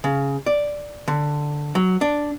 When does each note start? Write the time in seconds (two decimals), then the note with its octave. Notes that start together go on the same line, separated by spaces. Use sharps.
0.04 C#3
0.46 D5
1.08 D3
1.75 F#3
2.01 D4